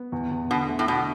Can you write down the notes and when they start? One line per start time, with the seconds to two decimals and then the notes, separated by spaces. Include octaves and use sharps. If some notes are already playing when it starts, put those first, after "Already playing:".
Already playing: B3
0.12 E2
0.31 E2
0.50 B2 D3
0.69 A3
0.79 A2
0.88 B2 D4